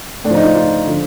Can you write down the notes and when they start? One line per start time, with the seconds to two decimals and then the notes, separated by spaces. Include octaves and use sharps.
0.25 A2 F3 D4
0.35 D#4
0.45 F4
0.55 F4
0.86 D3 F3